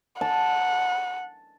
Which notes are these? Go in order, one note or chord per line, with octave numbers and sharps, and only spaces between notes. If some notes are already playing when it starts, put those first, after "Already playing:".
F#5 A5